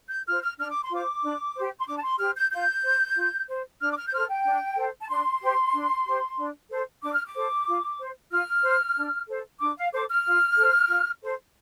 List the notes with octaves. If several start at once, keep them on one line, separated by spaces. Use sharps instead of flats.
G6
F4 C5 F6
F6
D4 F6
D6
C6
F4 C5 D6
D4
G4 C5
C6
D4 D6
A5
C6
G4 C5 F6
G6
F4 G6
C5
F4
C5
D4 F6
D6
F6
G6
A4 C5 F6
G5
D4
A4 C5
A5
D4 C6
G4 C5
D4
G4 C5
D4
A4 C5
D4 D6
F6
D6
A4 C5
F4
C5
F4 F6
C5
D4
A4 C5
D4 D6
F5
A4 C5 D6
F6
F4
A4 C5
F4
A4 C5